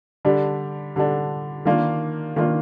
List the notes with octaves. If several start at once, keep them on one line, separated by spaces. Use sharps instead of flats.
D3 G3 D4
D3 G3 D4
D#3 A#3 D4 F4
D#3 A#3 D4 F4